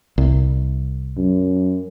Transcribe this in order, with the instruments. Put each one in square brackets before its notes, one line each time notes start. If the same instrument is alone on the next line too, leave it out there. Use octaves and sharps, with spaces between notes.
[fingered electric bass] C2
[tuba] F#2